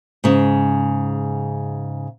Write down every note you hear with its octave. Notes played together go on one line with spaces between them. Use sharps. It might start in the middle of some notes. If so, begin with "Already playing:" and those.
G#2 C#3